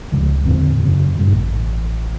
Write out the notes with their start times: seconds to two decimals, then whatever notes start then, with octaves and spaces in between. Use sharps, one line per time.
0.12 C#2 C#3 F3
0.45 E2 A2 D3 C4
0.81 F#2 C#3
1.17 G2 A#2
1.29 A1